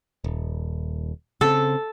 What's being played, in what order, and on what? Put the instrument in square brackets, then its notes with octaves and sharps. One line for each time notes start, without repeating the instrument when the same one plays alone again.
[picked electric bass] D#1
[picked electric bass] C#3 C4 [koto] A4